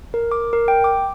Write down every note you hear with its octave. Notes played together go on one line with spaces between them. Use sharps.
A#4
D6
A#4
G5
D6